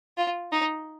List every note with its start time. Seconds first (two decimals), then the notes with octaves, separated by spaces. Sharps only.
0.18 F4
0.52 D#4